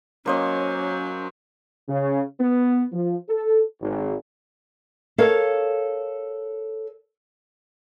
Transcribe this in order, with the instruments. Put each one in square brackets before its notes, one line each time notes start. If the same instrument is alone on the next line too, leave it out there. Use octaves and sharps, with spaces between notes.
[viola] F#3 [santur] A#3 C5 D#5 [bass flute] C#4 [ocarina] C#5
[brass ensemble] C#3
B3
F3
A4
G#1
[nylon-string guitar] A4 A#4 C#5 F5